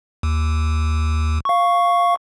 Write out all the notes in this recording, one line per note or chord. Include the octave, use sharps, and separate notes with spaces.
D#2
F5 C#6